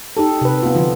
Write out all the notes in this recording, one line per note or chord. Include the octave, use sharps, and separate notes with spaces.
D#4 G4 A4
C3 B4
B3 F4
D3 F3